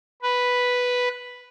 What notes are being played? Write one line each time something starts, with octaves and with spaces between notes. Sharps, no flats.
B4